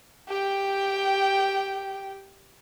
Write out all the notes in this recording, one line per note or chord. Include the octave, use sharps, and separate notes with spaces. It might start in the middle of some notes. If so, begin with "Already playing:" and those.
G4 G5